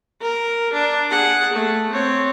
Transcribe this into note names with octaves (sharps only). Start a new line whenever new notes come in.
A#4
D4
G#4 F#5
A3
C4 C#5